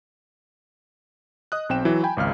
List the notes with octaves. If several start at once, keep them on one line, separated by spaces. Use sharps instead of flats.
D#5 D#6 F#6
B1 C4 G5 E7
E3 F#3 E4 F#4
G5 G#5 B5
G#1 C#2 F5 F6